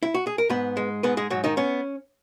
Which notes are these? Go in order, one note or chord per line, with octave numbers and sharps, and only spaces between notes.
E4
F#4
G#4
A#4
G#2 B3 B4
G#3
G#2 B3 B4
G#3 G#4
G#2 F#3 F#4
D#3 D#4
B3 C#4